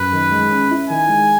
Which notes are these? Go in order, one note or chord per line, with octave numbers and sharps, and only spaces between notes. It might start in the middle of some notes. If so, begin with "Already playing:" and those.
Already playing: F#2 B4
D#3
G#3
C#4
E4
D#3 G#5
G#3